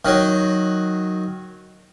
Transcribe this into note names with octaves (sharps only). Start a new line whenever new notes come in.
D#3 F#3